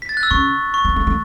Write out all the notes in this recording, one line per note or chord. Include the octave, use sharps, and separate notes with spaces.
B6
A6
F#6
E6
C#3 C#6
C#6
B3
A3
A3